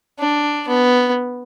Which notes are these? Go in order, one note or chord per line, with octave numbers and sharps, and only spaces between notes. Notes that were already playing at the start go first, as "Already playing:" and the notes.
D4
B3